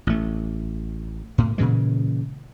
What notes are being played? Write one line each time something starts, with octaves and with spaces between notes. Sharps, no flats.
A1 A3
A2
A#2 C#3 E3 G#3